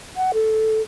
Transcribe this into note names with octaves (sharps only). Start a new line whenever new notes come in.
F#5
A4